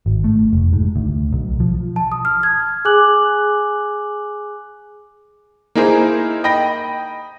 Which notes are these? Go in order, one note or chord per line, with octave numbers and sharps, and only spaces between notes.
G#1
A3
F1
G#2
D2
B1
F3
A5
D#6
F6
G#6
G#4 G#5 D6 F#6 F#7
A#3 D#4 E4 G#4 A#4 C5
D#5 G5 B5 A#6